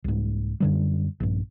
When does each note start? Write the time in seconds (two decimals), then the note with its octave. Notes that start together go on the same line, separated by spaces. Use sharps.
0.04 C2 G#2
0.60 F#2 D3 G3
1.20 A#1 G2